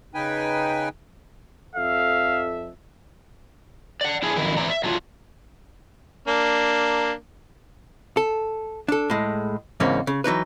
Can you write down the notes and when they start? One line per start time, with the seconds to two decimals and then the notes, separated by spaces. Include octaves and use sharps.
0.14 C#3 D#4 B4 G5 G#5
1.76 F2 A4 E5 F5
4.01 D5 F#5
4.22 D4 E4 G#4
4.36 F2 D3 D#3 F#3 E4
4.57 E3 A3 C4 E4 D5 A#5
4.70 E5
4.84 F#3 A3 D4 F4
6.28 A#3 D4
8.17 A4
8.88 D4 A4
9.10 A2 G#3
9.80 E2 G#2 C#3 A#3 C4 C#4
10.07 C#3
10.24 E3 F#3 D#4 B4